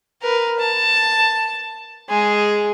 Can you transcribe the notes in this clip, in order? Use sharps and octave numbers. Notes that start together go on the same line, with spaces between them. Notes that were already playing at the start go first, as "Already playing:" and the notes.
A#4 B4
A5
G#3 G#4